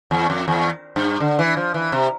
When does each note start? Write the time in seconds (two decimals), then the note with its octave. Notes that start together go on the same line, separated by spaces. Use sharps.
0.11 E2
0.30 F2
0.48 E2
0.96 G2
1.20 D3
1.39 E3
1.57 F3
1.74 E3
1.92 C3